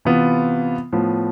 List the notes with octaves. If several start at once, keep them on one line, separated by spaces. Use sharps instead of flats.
C3 E3 B3 F4
A2 F3 B3